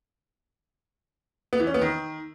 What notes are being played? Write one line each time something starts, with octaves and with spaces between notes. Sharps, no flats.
B3
E3
C#4
B3
D#3